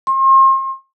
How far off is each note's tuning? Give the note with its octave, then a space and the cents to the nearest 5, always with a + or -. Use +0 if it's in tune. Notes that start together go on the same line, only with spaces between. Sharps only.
C6 +40